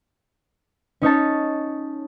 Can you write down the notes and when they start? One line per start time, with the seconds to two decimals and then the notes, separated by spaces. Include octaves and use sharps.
1.01 C#4 D#4 C#5 A5